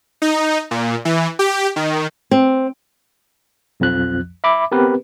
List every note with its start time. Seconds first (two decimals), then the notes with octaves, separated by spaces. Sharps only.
0.22 D#4
0.71 A#2
1.05 E3
1.39 G4
1.76 D#3
2.31 C4
3.80 B1 F2 F3 F#6
4.44 E5 B5 D6
4.72 B3 C4 G4 A#4 B4